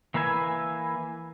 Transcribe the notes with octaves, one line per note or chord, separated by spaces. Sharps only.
E3 A#3 B4 E5 G#5